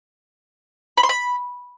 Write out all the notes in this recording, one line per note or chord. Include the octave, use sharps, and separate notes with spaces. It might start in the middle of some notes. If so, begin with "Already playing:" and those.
B5
C6
B5